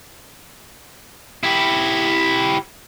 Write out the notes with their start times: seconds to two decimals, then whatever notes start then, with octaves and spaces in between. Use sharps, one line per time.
1.43 E4 G4